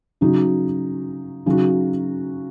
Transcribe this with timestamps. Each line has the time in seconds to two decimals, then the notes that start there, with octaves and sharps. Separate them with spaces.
0.21 C#3 F#3 D#4 F#4
1.46 C#3 F#3 D#4 F#4